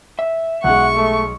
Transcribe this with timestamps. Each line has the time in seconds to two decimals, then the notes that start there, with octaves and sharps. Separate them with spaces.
0.19 E5
0.64 B1 G#3 F#5 C#6
0.97 A3